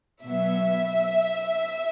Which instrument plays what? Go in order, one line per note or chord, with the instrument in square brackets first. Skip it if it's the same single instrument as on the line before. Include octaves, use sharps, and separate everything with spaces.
[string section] B2 F#3 B3 E5